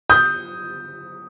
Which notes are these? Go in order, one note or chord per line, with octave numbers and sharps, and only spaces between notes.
D#6 G6